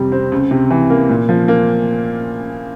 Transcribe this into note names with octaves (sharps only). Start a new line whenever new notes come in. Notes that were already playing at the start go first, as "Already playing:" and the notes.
Already playing: F2 C3 G3
C4
C#2
C3
E3
A#3
A#2
F3
A#3